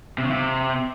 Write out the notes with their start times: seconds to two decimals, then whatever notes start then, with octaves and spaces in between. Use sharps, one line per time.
0.18 C3
0.24 C#3
0.31 C3